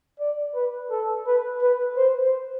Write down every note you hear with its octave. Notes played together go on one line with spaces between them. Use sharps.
D5
B4
A4
B4
B4
C5